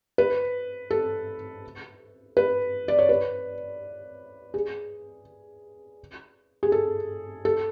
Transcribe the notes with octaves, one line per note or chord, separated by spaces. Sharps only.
B4
A4
B4
D5
C#5
B4
G#4
G#4
A4
A4